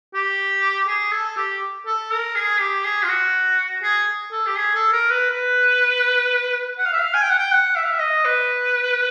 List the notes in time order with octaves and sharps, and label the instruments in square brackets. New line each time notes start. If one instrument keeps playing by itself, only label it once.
[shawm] G4
G#4
A4
G4
A4
A#4
G#4
G4
G#4
F4
F#4
G#4
A4
G4
G#4
A4
A#4
B4
B4
F#5
F5
E5
F5
G#5
G5
F#5
G5
F#5
E5
F5
E5
D#5
B4